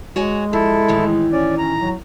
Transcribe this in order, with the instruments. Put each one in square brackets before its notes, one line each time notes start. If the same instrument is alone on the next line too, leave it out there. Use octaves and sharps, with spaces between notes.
[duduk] G#3 [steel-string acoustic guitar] F#4 C#5 G#5
[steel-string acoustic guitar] F3 [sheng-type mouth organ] E4 A4
[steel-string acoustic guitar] A2 D#3 E3
[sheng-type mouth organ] C#4 D5
[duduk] C#4 [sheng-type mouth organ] A#5
[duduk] F#3